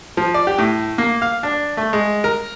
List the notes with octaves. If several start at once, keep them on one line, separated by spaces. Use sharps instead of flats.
F3
D5
G4
A2
A#3
F5
D4
A3
G#3
A#4